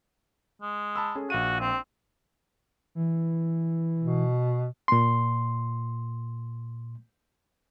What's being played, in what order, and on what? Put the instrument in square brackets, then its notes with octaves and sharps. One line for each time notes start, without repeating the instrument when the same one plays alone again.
[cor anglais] G#3
[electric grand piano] A5 B5 E6
C#4 G#4 A4
[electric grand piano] A#1 F5 D#7 [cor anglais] F#4
[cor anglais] C4
[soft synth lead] E3
[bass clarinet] B2
[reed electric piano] A#2 C6